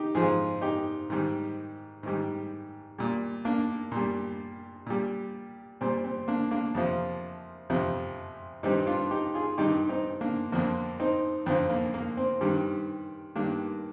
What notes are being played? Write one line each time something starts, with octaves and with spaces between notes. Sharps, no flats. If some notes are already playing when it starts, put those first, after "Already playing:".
Already playing: D#4 G4
G#2 F3 F4 G#4
D#4 G4
G#2 D#3 G3
G#2 D#3 G3
A#2 G3
A#3 D4
A#2 G3
A#2 G3
A#2 G3 C4
C4
A#3 D4
A#3 D4
F2 C3 F3
F2 C3 F3
G2 D#3 G3 C4 D#4
D4 F4
D#4 G4
F4 G#4
G2 D#3 G3 D#4 G4
C4 D#4
A#3 D4
F2 D3 F3 A#3 D4
C4 D#4
F2 D3 F3 C4
A#3
A#3
C4
G2 D#3 G3
G2 D#3 G3 A#3 D4